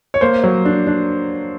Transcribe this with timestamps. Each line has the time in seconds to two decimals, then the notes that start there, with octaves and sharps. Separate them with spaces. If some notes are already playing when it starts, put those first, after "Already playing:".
0.14 C#5
0.21 A#3 C5
0.44 F#3
0.65 D4
0.87 D4